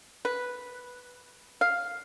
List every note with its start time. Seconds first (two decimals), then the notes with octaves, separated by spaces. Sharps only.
0.25 B4
1.61 F5